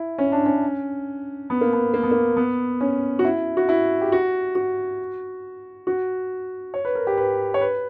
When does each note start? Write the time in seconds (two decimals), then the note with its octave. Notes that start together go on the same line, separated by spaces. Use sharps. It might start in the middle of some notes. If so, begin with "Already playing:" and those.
Already playing: E4
0.18 C#4
0.32 D4
0.46 C#4
1.50 B3
1.61 A#3
1.73 B3
1.94 A#3
2.03 B3
2.11 A#3
2.37 B3
2.81 C#4
3.19 F#4
3.25 E4
3.57 F#4
3.69 E4
4.01 G4
4.12 F#4
4.55 F#4
5.87 F#4
6.74 C#5
6.85 B4
6.95 A#4
7.07 G4
7.18 B4
7.54 C#5
7.61 B4